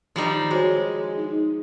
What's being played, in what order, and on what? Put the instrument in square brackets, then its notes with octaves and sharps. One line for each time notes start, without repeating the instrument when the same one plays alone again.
[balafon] D#3 D6 [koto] F3 G3 D#4
[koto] G#3 [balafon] F#4 C5 C#5
[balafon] D#4